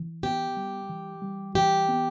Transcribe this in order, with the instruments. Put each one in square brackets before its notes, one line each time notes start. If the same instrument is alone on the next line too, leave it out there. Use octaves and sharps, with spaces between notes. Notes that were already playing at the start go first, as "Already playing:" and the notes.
Already playing: [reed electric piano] E3
[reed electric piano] B3 [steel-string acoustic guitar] G4
[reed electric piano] G3
E3
G3
[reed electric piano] E3 [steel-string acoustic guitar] G4
[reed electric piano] B3